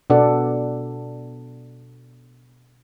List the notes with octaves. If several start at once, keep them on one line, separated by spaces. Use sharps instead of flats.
B2 B3 D4 A4 D5 F#5